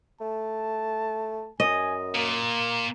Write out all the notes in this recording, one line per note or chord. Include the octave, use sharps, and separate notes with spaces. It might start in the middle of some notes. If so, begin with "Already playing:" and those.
A3 A5
F#2 D#5 G#5
A#2 A#3